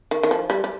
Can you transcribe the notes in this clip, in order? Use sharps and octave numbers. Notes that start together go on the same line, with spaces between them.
D#3
D#3
F3
G3
G3